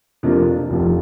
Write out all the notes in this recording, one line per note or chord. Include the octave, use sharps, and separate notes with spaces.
F2 C3 F3 A#3 D4
F1 F2 C3 F3